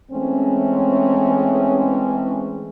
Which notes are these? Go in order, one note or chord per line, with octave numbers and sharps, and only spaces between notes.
E3 G#3 A3 C4 C#4